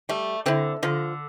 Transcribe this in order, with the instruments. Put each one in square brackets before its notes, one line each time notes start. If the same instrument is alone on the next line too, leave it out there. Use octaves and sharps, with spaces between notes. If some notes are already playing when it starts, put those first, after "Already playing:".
[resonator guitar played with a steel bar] G3 [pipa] A3
[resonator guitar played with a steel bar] D3 [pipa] C4 E4
[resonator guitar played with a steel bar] D3 [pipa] F3